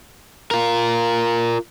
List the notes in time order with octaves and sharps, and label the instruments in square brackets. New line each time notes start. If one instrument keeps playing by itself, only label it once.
[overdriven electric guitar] F4 A#4